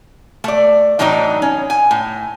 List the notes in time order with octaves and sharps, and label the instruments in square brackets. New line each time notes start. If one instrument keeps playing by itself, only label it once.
[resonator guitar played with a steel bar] A3 D5
A2 E3 F#3 D4 D#4
C#4
G#5
A2